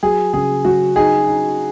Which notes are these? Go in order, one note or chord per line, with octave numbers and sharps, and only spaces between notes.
F#3 G#4
C#3 G#4
F#3 F#4
D#4 G#4
D#4